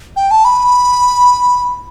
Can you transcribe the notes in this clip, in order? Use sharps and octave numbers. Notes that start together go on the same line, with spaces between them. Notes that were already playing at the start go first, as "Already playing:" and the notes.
G5
A5
B5